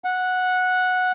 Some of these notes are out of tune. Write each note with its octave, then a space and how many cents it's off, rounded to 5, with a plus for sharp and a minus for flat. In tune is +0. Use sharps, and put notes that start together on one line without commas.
F#5 -10